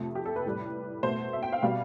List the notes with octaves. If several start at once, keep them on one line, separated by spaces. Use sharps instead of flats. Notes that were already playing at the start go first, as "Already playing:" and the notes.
Already playing: F2 C3 F3 A3
G4
A4
B4
A2 G3
B2 A3 C5
E5
G5
F5
B2 G3 F5